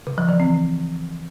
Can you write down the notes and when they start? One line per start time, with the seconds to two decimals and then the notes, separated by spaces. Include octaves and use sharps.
0.07 C#3
0.18 F3
0.29 E3
0.40 C4